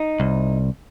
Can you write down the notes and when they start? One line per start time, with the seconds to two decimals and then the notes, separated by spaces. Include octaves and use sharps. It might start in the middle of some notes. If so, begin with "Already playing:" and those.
Already playing: D#4
0.20 C2